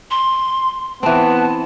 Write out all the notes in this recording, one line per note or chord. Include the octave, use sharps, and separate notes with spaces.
C6
E3 B3 C4 A5